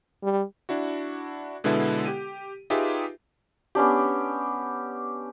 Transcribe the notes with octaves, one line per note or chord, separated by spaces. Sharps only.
G3
D4 E4 F#4
B2 D3 G#3 B3 E4 A4
G4 D#7
D#4 F4 G4 G#4 B4 E5
B3 C#4 D4 G4